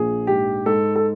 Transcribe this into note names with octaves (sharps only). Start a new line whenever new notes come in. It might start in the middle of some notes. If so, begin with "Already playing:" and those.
Already playing: A#1 F3 G#4
G#2 G4
G#2 A4
A4